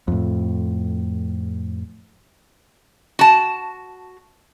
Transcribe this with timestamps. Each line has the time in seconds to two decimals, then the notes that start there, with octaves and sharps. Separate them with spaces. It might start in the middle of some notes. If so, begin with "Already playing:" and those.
0.08 F2 A2
3.19 F#4 A5